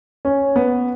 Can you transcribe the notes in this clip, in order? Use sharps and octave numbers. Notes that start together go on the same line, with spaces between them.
C#4
B3